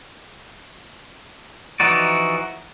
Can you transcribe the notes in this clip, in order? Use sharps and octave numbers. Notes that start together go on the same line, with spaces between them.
E3 F3 D#4 F#4 D5